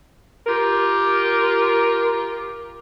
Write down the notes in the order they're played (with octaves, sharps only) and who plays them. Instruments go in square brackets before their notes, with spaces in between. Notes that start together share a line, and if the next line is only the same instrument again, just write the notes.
[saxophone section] F4 G4 A#4